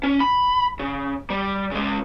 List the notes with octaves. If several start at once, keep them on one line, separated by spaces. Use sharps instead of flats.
C#4
B5
C#3
G3
C#3 G#3